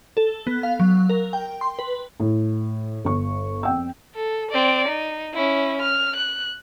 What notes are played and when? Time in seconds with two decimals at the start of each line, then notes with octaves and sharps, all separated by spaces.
0.17 A4
0.47 B3
0.63 F5
0.80 F#3
1.09 A#4
1.33 G5
1.61 C6
1.79 B4
2.20 A2
3.05 G1 C#6
3.63 F2 G5 E6
4.15 A4
4.51 C4 D5
4.88 D#4
5.34 C#4 E4
5.82 F6
6.16 F#6